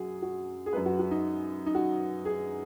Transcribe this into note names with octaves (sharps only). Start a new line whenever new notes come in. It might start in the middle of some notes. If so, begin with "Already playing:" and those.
Already playing: F#2 F#4 G#4
F#4
G#4
F#2 F#3 B4
F#4
F#4
D#4
D#4
F#4
G#4